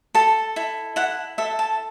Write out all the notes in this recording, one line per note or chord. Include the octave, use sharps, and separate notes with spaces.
A4 A5
E4
E4 F#5
A4 E5
A5